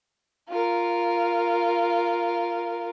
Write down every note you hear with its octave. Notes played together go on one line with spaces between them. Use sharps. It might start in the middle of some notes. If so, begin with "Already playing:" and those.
F4 A#4